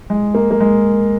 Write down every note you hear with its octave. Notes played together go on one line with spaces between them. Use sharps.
G#3
A#3
A#3
G#3